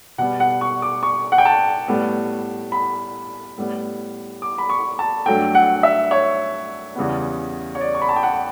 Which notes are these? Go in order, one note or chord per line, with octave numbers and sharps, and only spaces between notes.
B2 G3 B3 F#5
F#5
C#6
D6
C#6
F#5
G5
A5
A2 G3 B3
B5
A2 G3 B3
D6
B5
C#6
A5
G2 F#3 A3 G5
F#5
E5
C#5
E2 C#3 G3 B3
C#5
D5
C#6
B5
A5
G5
F#5